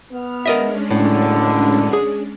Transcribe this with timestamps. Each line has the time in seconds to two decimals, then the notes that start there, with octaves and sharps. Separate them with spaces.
0.12 B3 F6
0.46 G#3 C#4 D4 A#4 D#5 E5
0.91 C#2 F#2 A2 D3
1.93 G#4